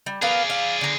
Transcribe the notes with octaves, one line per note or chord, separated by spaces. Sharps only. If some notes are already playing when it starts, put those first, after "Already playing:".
G3
B3 G#4 A#4 D5 F5
F5
D3 A#5